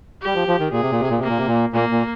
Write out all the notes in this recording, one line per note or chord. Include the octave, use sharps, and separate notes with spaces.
G3 G4
F3
F3
D#3
A#2 G#4
C3
A#2
C3
A#2
C3 A#3
A#2
C3
A#2
A#2 A#3
A#2